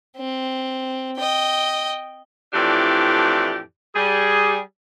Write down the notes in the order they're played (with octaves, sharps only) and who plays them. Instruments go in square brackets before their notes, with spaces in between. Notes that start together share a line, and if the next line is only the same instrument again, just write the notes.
[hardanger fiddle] C4
D#5 G5
[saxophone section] F2 A2 E3 D4 G4 D5
G3 G#4